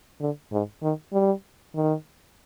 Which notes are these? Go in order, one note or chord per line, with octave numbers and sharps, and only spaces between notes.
D3
G#2
D#3
G3
D#3